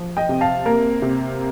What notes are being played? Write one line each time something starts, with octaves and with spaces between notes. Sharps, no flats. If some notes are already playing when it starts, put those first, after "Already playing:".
Already playing: F3
D#5 G5
C3
F5 A5
A#3 A#4
C3